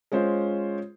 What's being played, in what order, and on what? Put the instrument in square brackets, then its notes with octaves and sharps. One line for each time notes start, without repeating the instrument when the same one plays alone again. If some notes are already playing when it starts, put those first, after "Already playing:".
[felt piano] G#3 C#4 F4 C5